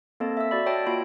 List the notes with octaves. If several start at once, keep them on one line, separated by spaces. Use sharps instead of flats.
A#3 C4 A4 D#5 A5
E5 E6
F#4 D5 B5
F#4 C#5 D#5 G5 A5
A#3 F4 F#4 G5 B5 D7